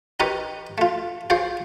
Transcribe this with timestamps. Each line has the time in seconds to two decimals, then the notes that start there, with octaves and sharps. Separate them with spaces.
0.20 D#4 G4 A#4 B4 C#5 D5
0.78 A3 F4
1.30 F4 G#4 C5 C#5 F5